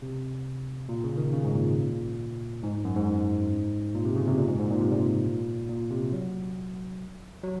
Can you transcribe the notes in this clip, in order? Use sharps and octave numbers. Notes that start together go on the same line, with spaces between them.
C3
A#2
C#3
D#3
C#3
G#2
A#2
G#2
F#2
G#2
A#2
C3
C#3
C3
A#2
G#2
G#2
A#2
C3
A#2
A#2
C3
F#3
F#3